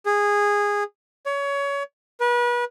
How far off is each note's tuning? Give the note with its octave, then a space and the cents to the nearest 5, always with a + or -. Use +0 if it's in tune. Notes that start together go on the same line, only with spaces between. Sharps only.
G#4 -15
C#5 +25
B4 -35